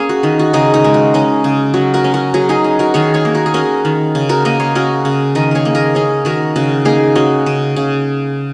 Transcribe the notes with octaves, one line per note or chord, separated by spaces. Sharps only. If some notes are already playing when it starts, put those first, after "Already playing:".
Already playing: A#3 C#4 G#4 C#5
F#4
D#3 D#4
F#4
C#3 D#4 G#4
D#4
G#3
F#4
C#4 D#4
C#3
F#3 F#4
F#4 A#4
C#4
F#4 A#4
F#3 G#4 C#5
D#4 G#4
C#4
F#4 A#4
D#3 G#4 C#5
G#4 C#5
A#3
F#4 A#4
G#4
C#4 F#4 A#4
D#3
C#3
F#4 A#4
A#3 A#4 D#5
G#4 C#5
C#4 F#4 A#4
C#3
D#3 A#4 D#5
G#4 A#4 C#5
A#3
A#4 D#5
C#4 G#4 C#5
D#3 F#4 A#4
C#3 F#4
A#3 D#4 G#4
C#4 F#4
C#3
C#3